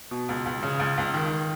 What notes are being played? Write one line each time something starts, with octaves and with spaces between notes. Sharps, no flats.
B2
C#2
C#2
C#3
C#2
C#2
D#3